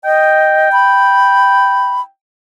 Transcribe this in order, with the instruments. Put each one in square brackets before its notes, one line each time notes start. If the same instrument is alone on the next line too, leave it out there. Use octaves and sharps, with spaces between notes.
[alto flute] D#5 [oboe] G5
[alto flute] B5